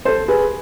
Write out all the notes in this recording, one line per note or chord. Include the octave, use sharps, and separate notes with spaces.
A4 C5
G#4 B4